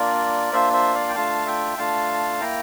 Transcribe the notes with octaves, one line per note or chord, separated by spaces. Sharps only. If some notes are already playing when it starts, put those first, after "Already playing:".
Already playing: A#3 D4 F4 A#4 D5
A#3 D4 F4 C5 E5
C5 E5
D5 F5
G5
A3 D4 F4 F5 A5
E5 G5
A3 D4 F4 F5 A5
A#3 E4 G5 A#5